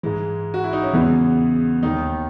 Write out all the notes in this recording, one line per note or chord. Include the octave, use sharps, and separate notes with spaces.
G#2 E3 G#3
F#4
E4
D#4
C#4
E2 C#3 E3 B3
D#2 D#3 D#4